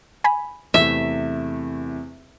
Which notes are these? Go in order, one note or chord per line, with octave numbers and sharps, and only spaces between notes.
G#5 B5
E2 C3 A3 E5